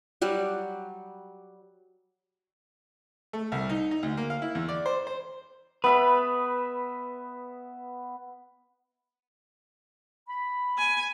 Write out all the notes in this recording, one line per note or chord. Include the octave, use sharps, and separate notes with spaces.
F#3 G3 F#4
A3
C2
D#4
D#4
D2
A#3
F5
E4
E2
D5
C5
C5
B3 B4 E5 B5
B5
G#5